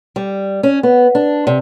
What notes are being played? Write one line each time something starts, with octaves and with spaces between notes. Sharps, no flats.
G3
C#4
B3
D4
C3